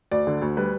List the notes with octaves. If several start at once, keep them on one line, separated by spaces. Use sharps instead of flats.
D2 D5
D3
D2
G3 B4